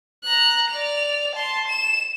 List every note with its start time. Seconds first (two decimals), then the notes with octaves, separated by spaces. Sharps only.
0.24 A#5 F#6
0.70 D5 F7
1.34 A5 C6
1.67 E7